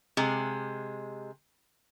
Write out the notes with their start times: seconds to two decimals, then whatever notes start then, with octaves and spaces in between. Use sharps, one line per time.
0.17 C3 G#3